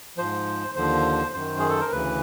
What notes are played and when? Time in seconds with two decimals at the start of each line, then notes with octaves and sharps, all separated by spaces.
0.17 G#2 F3 C5
0.76 D#2 D3 F3 C5
1.34 F#2 D#3 C5
1.59 G#4
1.69 A4
1.81 A#4
1.92 D2 C#3 E3 B4